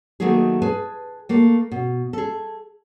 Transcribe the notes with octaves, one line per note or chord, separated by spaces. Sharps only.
D#3 F#3 A3 A#3 D#4 G#4
G#4 B4 G#5 A5
A3 A#3
B2
G#4 A4